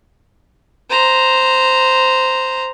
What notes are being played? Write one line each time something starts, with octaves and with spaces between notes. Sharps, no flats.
C5 A#5